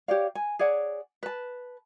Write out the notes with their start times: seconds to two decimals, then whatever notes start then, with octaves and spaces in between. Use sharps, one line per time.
0.08 G4 C#5 D5 F5
0.35 G#5
0.59 G#4 C#5 D5 F#5
1.23 B4 A5